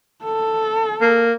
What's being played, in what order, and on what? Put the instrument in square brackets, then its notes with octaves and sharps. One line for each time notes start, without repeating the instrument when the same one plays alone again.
[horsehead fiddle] A4
[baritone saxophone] A#3